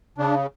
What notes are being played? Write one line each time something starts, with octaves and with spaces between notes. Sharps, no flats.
C#3 D4